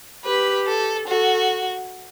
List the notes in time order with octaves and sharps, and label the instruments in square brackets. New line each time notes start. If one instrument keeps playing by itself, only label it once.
[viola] G4 [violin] B4
[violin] A4
[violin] F#4 [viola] A4